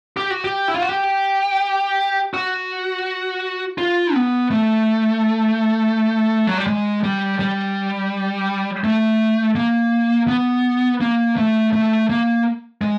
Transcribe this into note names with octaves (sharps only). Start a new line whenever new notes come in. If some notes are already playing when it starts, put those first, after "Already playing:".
G4
F#4
G4
E4
F4
F#4
G4
F#4
F4
B3
A3
F#3
G3
G#3
G3
G3
A3
A#3
B3
A#3
A3
A3
A#3
G#3